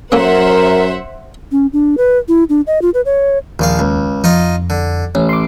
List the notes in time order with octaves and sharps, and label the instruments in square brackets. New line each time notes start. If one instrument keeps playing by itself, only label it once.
[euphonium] F#2 [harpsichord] A#3 C#4 A4 [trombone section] A#4 [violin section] C5 E5 F#5
[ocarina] C#4
D4
B4
E4
D4
D#5
F4
B4
C#5
[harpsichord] A#1 F3 F5 [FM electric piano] D#2
[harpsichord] C#2
[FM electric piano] F2 [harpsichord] D#4 F4 D#5
[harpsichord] D3
[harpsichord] A1 [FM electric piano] C#4
[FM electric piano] C6 D6